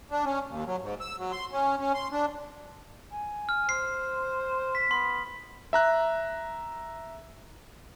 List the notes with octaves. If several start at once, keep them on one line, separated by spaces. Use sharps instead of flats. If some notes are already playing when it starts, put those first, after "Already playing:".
D4
C#4
D#2
F#3
G#2
E6
F#3
C6
C#4
C#4
C6
D4
G#5
F6
C5 C7
B6
B3 C6
E5 A#5 F#6